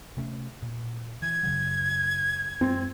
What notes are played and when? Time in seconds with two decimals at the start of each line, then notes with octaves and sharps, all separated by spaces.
0.17 C3 A3 C#4
0.62 A#2
1.22 E3 G#6
1.43 F#2 C#3 F#3
2.61 F#2 G#3 C4